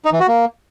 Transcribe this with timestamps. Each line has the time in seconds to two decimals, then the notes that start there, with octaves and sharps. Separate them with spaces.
0.05 D#4
0.13 E3
0.20 F#4
0.28 A#3